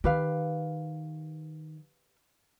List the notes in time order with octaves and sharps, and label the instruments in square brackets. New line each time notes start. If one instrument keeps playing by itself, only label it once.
[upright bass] D#3 [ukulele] G4 B4 F5